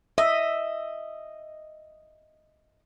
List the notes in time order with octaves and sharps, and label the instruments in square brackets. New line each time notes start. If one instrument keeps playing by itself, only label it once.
[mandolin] D#5 [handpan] E5